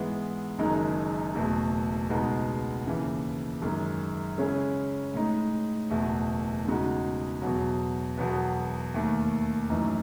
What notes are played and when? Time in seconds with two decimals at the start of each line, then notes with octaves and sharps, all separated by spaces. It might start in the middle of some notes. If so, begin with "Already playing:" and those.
Already playing: G#2 E3 G#3 B3
0.58 F#1 F#2 D#3 G#3 D#4
1.34 F#1 E2 B2 A3
2.10 C#2 B2 G#3 B3 D#4
2.86 D#2 C#3 E3
3.62 F#2 D#3 G#3
4.38 C#3 G#3 C#4 E4 G#4
5.14 A2 G#3 D#4
5.90 F#1 E2 B2 A3
6.65 E2 C#3 G#3 D#4 F#4
7.42 E2 B2 F#3
8.17 E1 E2 B2 F#3 B3
8.94 D#2 D#3 A3
9.70 F#2 E3 A3 D#4